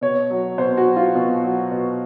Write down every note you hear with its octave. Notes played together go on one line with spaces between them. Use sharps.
B2 C#5
F#3
B2 C5
F#4
F#3
F4
B2
F#3
B2